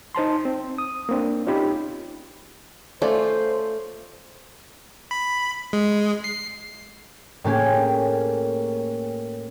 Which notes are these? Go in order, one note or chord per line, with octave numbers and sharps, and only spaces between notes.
D#4 C5 A5 C6
C4
D#6
A#3 C4 D4
C#4 D#4 F4 G4 B5
A3 C#4 F4 C5 D5
B5
G#3
C7
A2 A#3 C#4 G4 G#4